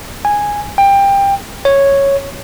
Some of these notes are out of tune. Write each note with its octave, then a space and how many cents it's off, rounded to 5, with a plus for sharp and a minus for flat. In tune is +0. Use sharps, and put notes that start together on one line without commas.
G#5 -10
G5 +20
C#5 -5